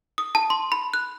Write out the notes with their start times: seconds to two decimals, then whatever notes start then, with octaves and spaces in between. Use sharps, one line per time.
0.18 D#6
0.35 A5
0.50 C6
0.72 B5
0.94 F#6